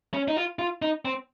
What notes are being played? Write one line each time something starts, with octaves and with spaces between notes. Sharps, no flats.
C#4
D#4
F4
F4
D#4
C4